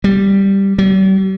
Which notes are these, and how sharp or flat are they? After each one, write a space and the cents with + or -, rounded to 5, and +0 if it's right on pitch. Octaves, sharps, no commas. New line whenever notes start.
G3 +0
G3 -45